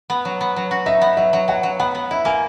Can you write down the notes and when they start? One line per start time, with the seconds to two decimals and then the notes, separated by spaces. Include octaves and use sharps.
0.10 B3
0.25 F#3
0.41 B3
0.56 F#3
0.71 F#4
0.86 D#4 E5
1.02 B3
1.17 F#3 E5
1.33 F#3
1.48 F#3 F#5
1.63 F#3
1.80 B3 F#5
1.95 B3
2.11 E4 E5
2.25 A#3 G#5